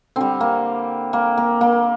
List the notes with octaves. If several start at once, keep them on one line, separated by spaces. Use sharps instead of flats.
D3 G3 C4
A#3
A#3
A#3
A#3